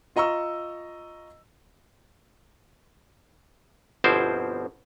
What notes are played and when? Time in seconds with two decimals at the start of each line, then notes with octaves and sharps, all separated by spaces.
0.16 F4 D#5 A#5 C#6 E6
4.04 G1 B2 F3 C4 E4 C5